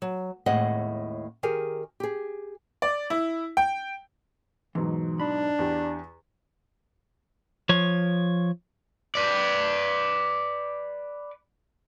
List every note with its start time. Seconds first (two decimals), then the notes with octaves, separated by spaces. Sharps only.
0.02 F#3
0.46 D#2 A2 G#3 C4 D#5 F#5
1.43 D#3 G4 G#4 A#4
2.00 G4 G#4
2.82 D5
3.10 E4
3.57 G5
4.75 G#2 B2 E3 F#3
5.20 D4 B5
5.59 E2 G4
7.69 F3 C#5
9.15 B4 D5